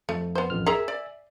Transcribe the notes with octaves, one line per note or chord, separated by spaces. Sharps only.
F2 A3
B3 C5
A1 F2 F6
G#4 A#4 E5 G#5 A#5
D5